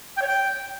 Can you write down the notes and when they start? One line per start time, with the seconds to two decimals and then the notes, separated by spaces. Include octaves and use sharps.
0.17 G5
0.22 C#5
0.27 G5